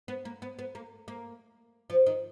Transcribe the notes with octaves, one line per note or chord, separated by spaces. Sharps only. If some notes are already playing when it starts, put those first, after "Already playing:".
B3
A#3
B3
B3
A#3
A#3
F3
D#3